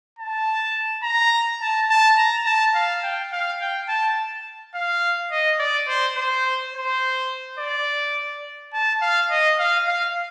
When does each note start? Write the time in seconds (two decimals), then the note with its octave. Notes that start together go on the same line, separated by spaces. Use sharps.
0.19 A5
1.03 A#5
1.61 A5
1.90 A5
2.17 A#5
2.46 A5
2.75 F5
3.03 G5
3.32 F5
3.61 G5
3.89 A5
4.75 F5
5.32 D#5
5.59 D5
5.88 C5
6.17 C5
6.74 C5
7.59 D5
8.73 A5
9.02 F5
9.30 D#5
9.59 F5
9.88 F5